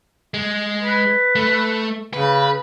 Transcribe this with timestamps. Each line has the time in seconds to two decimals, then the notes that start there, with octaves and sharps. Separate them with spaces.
0.34 G#3
0.82 B4
1.35 A3
2.13 C#3 B4